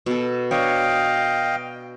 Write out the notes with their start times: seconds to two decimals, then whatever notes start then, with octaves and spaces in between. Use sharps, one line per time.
0.06 B2 A4
0.51 D4 C#5 D#5 F5 G5